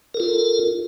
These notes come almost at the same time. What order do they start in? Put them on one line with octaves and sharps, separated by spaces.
A#4 A4 F4